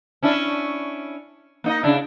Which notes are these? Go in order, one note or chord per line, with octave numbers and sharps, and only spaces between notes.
C#4 D4 E4
A#3 D#4 D#5
C#3 D4 E4